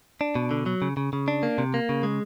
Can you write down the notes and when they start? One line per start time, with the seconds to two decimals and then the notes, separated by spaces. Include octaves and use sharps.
0.21 D4
0.35 B2
0.51 D3
0.66 F#3
0.82 C#3
0.97 C#3
1.13 C#3
1.28 D4
1.43 A#3
1.58 C3
1.74 A#3
1.89 C#3
2.03 G#3